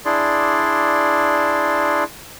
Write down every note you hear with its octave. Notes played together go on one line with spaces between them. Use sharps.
D4 E4 G#4 D5 C6